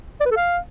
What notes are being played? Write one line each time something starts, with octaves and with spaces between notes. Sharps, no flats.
D5
B4
A4
F5